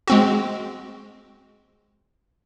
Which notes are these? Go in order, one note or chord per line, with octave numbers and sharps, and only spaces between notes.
G#3 C4 F#4